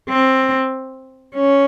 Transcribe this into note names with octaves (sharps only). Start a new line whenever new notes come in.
C4
C#4